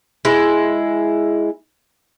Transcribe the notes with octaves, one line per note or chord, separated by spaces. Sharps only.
G#3 E4